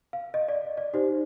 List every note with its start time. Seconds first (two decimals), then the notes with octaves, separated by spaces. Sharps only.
0.13 F5
0.34 D#5
0.48 D5
0.77 D5
0.93 D#4 G4 C5